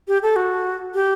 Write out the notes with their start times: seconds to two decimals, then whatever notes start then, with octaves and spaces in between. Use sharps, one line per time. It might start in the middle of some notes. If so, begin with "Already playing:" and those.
0.08 G4
0.23 A4
0.36 F#4
0.94 G4